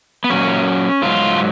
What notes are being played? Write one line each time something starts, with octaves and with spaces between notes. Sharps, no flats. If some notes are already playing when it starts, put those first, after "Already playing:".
B3
A#2 F#3 C#4
G#2 F#3 F4